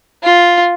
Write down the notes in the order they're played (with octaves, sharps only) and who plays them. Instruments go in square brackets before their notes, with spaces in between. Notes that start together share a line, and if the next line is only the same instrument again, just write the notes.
[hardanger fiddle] F4